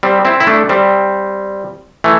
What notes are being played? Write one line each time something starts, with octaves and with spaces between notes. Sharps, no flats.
G3 C4
C4 E4
E4
A3 D4
G3 C4
E3 A3